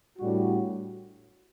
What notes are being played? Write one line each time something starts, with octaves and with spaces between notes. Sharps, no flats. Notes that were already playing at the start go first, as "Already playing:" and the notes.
A2 G3 D4 F#4